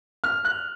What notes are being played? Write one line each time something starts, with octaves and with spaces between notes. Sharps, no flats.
F6
F#6